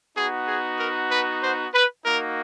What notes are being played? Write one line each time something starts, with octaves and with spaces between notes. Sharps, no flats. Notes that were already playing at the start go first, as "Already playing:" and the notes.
B3 D#4 F#4 G#4
G#4
A#4
B4
C5
B4
A#3 D#4 F#4 A#4